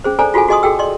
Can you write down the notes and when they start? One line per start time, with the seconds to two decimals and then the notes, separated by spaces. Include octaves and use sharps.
0.04 C#4 G#4 C5
0.19 D4 A4 C5 D5 G#5 A#5
0.34 F4 F#4 G#4 A4 G#5
0.48 F#4 G#4 D#5 G#5 C6 D#6
0.63 F#4 G#4 A4 G5 E6
0.79 D5 D#5 C6